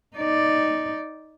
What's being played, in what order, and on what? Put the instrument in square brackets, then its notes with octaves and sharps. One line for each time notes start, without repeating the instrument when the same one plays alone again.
[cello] D#4 D5